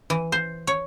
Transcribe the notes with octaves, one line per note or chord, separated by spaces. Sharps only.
E3
C5
C#5